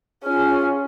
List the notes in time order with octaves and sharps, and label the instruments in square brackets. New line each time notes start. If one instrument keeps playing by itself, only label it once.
[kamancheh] C#4 [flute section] F4 G#4 F6